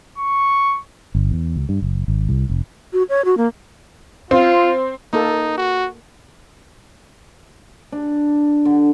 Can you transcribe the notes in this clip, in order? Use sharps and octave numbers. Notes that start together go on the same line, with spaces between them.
C#6
G1
E2
C#2
G2
F#1
G#1
C2
F1
F#4
C#5
F#4
A#3
C4 F4
A#3 D#4 A4
F#4
D4
D3